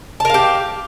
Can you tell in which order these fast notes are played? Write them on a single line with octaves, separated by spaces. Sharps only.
A5 A#4 F5 G4